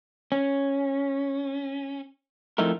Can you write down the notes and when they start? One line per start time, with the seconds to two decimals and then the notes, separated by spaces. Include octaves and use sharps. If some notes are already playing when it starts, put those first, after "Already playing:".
0.32 C#4
2.58 F2 F3 A3 D#4 E4 A#4